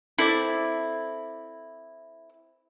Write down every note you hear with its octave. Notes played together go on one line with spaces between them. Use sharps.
C4 E4 A4 D5